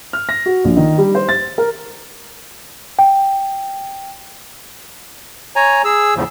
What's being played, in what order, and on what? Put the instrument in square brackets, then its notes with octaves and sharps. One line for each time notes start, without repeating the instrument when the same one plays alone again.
[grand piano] F6
A#6
F#4
A#1
D#3
G3
C5
A6
A#4
[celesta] G5
[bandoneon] C#5 G#5 A#5
G#4 E6
E2 A2 C#3 F3